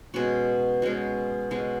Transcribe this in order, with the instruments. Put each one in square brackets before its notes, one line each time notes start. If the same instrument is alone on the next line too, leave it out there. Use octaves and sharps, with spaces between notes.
[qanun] B2 G#3 C#4 F#4
B2 G#3 C#4 F#4
B2 G#3 C#4 F#4